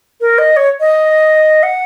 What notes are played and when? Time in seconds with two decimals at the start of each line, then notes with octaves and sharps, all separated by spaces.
0.21 A#4
0.38 D#5
0.57 C#5
0.80 D#5
1.63 F#5